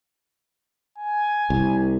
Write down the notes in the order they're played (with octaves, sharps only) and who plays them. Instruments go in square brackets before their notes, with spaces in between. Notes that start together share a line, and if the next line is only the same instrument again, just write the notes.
[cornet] G#5
[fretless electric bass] C2